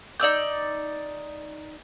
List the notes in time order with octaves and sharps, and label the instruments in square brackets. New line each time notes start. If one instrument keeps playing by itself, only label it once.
[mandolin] D#4 D5 E6 G6